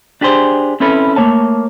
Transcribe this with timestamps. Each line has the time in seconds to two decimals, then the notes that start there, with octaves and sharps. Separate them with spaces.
0.21 D4 G4 G#4 C5
0.80 C4 C#4 E4 A4 B4
1.16 A3 A#3 C#5 A5